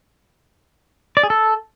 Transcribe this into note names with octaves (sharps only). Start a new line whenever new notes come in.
D5
G#4
A4